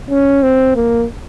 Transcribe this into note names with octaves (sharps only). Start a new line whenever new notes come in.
C#4
C4
A#3